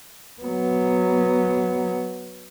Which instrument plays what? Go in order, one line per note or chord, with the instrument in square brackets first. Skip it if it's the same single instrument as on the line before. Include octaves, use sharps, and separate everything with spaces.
[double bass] F#3 B3